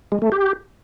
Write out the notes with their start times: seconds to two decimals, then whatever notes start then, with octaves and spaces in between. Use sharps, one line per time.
0.12 G#3
0.22 A3
0.32 G4